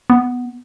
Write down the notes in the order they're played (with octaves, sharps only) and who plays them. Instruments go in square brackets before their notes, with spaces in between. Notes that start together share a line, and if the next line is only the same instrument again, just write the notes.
[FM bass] B3